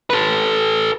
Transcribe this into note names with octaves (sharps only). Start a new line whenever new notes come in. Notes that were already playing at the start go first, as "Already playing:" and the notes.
A4 B4